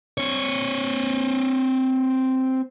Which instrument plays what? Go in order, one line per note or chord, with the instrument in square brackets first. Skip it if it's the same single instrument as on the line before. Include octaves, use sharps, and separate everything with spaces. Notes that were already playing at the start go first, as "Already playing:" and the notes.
[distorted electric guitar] C4 C#5